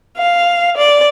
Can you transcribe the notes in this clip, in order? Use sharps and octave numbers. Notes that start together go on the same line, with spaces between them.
F5
D5